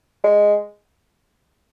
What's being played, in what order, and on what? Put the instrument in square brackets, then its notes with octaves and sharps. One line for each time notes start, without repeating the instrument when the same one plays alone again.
[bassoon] G#3